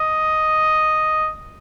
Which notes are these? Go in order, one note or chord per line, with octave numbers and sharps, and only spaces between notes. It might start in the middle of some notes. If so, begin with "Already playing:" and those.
Already playing: D#5